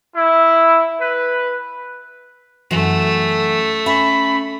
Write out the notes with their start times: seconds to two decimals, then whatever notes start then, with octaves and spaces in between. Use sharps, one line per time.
0.15 E4
0.99 B4
2.71 F#2 E3 A3 F#4
3.86 C#4 E5 B5